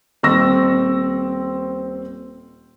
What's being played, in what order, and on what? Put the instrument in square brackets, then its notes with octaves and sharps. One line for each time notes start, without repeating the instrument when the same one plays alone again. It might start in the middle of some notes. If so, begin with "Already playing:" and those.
[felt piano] D#1 C4 C5 C#6 E6 A#6